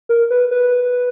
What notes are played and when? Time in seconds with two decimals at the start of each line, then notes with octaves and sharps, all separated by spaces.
0.09 A#4
0.31 B4
0.51 B4